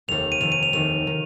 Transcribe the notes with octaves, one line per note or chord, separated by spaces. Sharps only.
F1 D#2 D#3 F7
D#7
F1 D#2 D#3 F7
D#7
F7
F1 D#2 D#3 F7
D#3